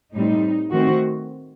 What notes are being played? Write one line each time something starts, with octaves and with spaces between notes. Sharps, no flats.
A2 G3 C4 D#4
D#3 A3 C4 F#4